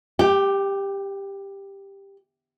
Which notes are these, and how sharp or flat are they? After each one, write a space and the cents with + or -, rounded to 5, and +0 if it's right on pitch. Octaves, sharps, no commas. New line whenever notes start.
G4 +10 G5 -30